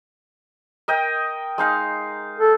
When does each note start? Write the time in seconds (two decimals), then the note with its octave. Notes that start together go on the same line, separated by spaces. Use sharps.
0.88 A#4 D#5 G5
1.58 G#3 D#4 F5
2.40 A4